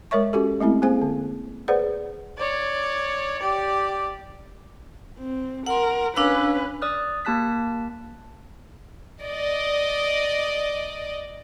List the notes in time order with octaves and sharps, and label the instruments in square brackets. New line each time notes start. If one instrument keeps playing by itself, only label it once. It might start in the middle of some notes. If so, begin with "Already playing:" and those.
[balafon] G#3 A#4 C#5 E5 C#6
C#4 F#4 G4 A4
G#3 A3 C4 E4
A#3 C4 G#4 C5 G#5
D3
G#4 B4 C5 D5 F#5
[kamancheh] C#5 D5
G4 D5
[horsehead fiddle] C4
[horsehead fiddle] A#4 [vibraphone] F#5 C6
[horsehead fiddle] C#4 B4 [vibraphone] D4 F5 E6
[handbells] D5 D#6 F6 F#6
A#3 G4 A5 F#6 B6
[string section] D5 D#5